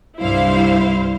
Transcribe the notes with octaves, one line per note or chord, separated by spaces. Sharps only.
C2 G2 E4 C5 F5